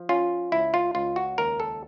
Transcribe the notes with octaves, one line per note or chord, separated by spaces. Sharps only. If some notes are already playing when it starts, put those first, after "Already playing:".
Already playing: F3
C#4 F4
C#2 E4
F4
C#2 F4
F#4
D#2 A#4
A4